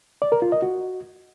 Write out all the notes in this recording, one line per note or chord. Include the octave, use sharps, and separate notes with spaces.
D5
A#4
F4
D#5
F#4